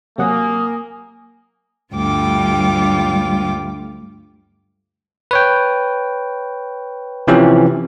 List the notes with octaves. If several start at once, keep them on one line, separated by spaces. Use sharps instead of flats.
C3 F#3 A#3 F#5 G#5 D#6
D2 G2 G3 F4 G5 D6
B4 C#5 G5
C3 E3 F3 C#4 G4